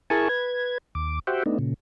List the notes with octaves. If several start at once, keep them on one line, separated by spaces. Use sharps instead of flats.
E4 G#4 A#4 G#5 A5 C#6
B4 G#6
D#2 D6
F#4 G4 C5 E5 F#5 G5
A3 B3 D4 D#4
A#2 C#3